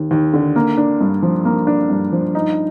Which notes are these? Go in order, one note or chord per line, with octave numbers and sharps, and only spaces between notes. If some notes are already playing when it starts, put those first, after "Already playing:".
Already playing: D#2
D#2
D3
A#3
D4
G2
F3
A#3
D4
G2
F3
D#4